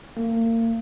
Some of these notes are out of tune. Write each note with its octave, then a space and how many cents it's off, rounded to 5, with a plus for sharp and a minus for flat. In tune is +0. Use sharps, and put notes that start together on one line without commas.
A#3 -35